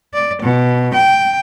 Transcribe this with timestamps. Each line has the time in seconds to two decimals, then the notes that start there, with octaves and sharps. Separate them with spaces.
0.14 D5
0.42 B2
0.94 G5